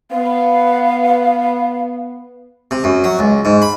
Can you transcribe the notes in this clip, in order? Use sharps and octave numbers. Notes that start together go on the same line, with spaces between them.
B3 F5
C3
F#2
F#3
C#2
G#2
B5